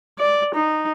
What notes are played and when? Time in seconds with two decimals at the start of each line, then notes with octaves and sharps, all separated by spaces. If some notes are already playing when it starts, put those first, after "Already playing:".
0.19 D5
0.55 D#4